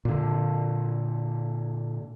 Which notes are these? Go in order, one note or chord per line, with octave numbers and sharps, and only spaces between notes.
A#2 D3